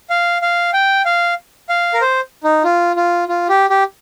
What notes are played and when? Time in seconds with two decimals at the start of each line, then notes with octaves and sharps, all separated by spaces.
0.10 F5
0.42 F5
0.74 G5
1.05 F5
1.69 F5
1.94 A#4
2.01 C5
2.44 D#4
2.64 F4
2.96 F4
3.28 F4
3.49 G4
3.70 G4